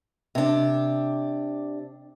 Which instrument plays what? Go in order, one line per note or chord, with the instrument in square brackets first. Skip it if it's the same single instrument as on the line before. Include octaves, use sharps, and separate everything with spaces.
[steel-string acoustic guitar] C3 D4